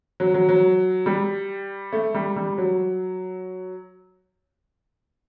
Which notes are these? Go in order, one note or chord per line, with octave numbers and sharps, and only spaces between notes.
F#3
F#3
F#3
G3
A3
G3
G3
F#3